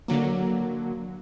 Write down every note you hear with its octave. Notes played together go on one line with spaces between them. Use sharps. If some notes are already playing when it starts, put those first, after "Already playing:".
D3 F#3 A#3